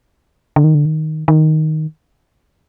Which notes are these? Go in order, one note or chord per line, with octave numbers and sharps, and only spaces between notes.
D3
D#3
D3
D#3
D#3